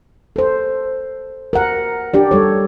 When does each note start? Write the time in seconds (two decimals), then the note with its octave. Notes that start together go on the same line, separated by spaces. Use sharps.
0.36 A4 C5
1.53 A#4 F#5
2.14 D4 G4 D5
2.31 G3 A4 C#5